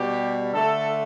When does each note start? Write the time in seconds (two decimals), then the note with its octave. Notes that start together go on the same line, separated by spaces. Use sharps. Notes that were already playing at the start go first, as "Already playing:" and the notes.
Already playing: B2 G3 G4
0.54 D3 A3 A4